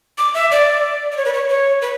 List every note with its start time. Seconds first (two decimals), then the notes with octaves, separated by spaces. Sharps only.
0.18 D6
0.34 E5
0.51 D5
1.12 D5
1.17 C#5
1.25 B4
1.33 C#5
1.50 C#5
1.82 B4